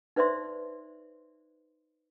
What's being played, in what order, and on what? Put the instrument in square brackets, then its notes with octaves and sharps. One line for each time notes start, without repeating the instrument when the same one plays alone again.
[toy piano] D#4 B4 C5 D5 E5 C6